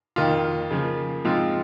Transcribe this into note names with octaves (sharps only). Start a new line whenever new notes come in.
F2 D#3 A#3 F4
C#3 F3 A#3
G#2 F3 G#3 C4 F4